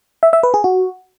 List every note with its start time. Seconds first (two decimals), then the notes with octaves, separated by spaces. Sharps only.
0.23 E5
0.33 E5
0.43 B4
0.54 G#4
0.64 F#4